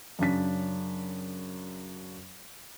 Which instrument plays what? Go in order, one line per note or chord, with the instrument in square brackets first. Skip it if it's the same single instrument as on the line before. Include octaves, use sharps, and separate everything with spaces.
[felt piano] F#2 C#3 D4 B6